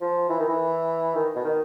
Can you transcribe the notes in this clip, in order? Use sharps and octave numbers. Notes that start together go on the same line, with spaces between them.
F3
E3
D#3
E3
D#3
B2
D#3